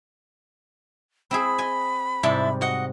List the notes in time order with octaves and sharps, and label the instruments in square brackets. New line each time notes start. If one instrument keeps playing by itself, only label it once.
[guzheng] C4 E4 G#4 [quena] B5
[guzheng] D#5 G#5
[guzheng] G#2 C3 G3 [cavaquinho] E4 E5 A5
[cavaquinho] F#4 D#5 F#5